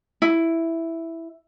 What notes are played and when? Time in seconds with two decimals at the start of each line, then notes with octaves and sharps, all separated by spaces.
0.22 E4